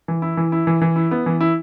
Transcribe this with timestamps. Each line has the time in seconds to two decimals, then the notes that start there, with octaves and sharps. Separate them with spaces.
0.08 E3
0.22 E4
0.37 E3
0.52 E4
0.67 E3
0.81 E3
0.96 E4
1.11 B3
1.26 E3
1.41 E4